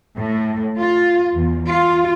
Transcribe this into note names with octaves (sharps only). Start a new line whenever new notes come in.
A2
F4
E2
F4